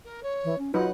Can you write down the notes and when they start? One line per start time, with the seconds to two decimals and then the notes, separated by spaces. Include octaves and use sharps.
0.04 A#4
0.23 C#5
0.44 E3
0.58 C#4
0.74 F#3 D#4 F4 B4 F#5